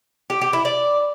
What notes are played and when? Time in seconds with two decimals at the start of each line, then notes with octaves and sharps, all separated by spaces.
0.30 G4
0.42 G4
0.53 E4
0.65 D5